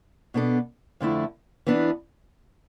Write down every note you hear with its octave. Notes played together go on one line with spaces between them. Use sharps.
B2 B3 D4 A4
F2 D3 A3 E4
E3 B3 D4